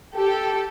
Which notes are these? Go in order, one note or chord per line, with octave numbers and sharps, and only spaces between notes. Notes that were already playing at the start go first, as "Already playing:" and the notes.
G4 A4